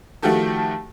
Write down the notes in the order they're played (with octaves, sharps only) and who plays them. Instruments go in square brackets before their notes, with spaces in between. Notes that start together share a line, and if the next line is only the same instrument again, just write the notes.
[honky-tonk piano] D#3 F3 A3 F#4 G4 A4